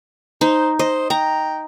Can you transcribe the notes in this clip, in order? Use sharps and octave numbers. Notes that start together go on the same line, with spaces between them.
D#4 C5
C5 D#5
G5 A#5